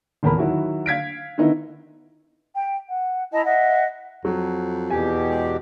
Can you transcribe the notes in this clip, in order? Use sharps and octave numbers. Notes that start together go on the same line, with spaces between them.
D#1 E2 A#4 B5
D#3 F#3 E4 F#4
F5 G#6 B6 D7
D3 D#3 B3 D#4 E4
G5
F#5
E4 D#5 A5 A#5
D#5 E5 F#5
F2 F#3
E2 B2 G4 G#5
G#3